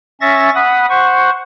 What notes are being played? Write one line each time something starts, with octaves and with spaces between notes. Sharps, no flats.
C#4 E5 C#6 A6 A#6
F#5 B5 D#6
C5 F#5 C#6